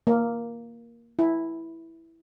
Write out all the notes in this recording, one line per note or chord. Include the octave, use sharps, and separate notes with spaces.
A#3
E4